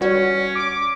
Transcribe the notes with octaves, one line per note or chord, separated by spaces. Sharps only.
G3 C#4 F#4 B4 C#5 D5
D6